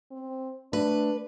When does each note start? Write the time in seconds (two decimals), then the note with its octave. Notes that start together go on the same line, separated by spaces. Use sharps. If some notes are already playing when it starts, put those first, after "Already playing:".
0.11 C4
0.73 A3 D4 B4